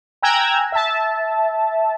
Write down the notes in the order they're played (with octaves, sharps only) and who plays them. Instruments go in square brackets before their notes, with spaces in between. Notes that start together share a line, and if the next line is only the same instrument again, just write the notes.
[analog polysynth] G5 G#5 A#5 E6 F#6 G#6
E5 A5